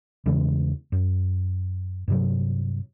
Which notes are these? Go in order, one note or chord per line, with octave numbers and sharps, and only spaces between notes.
E2 C#3 E3 G#3
F#2
G2 C3 F#3